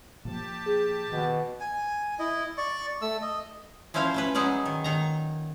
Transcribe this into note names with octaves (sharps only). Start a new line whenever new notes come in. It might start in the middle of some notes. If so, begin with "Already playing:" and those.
A#2 F3 A#3 G4 A5
G#4
B2 D#3
G#5
E4 D#5
D5 C#6
A3 E6
D#5
F3 C#4 E4 C5 F5
A3 C#4 B4
F#3 G#3 C#4 D#4 D5
D#3
A#2 D#3 A#5